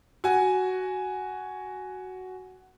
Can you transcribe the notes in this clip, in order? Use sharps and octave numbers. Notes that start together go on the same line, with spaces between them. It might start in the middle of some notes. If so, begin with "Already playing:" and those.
F#4 G#5